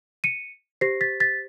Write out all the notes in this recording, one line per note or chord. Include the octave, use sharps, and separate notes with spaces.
C#7 D#7
G4 C5 A#6 C7
A6 B6
A6 B6